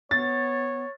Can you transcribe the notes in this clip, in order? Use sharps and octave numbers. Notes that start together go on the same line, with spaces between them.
B3 C#5 A6